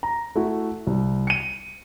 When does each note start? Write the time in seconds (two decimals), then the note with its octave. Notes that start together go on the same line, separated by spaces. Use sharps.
0.03 A#5
0.36 A3 E4 F#4
0.87 C2
1.27 C#7 D#7